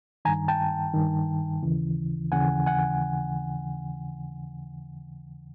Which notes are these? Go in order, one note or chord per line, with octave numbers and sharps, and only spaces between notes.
G2 D#3 G#5 A#5
G5 A5
G2 D#3
D#2 C#3 E3
D#2 C#3 E3 F#5 G#5
F#5 G#5